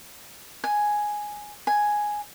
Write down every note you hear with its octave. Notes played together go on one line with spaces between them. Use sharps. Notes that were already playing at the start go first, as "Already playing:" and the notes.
G#5
G#5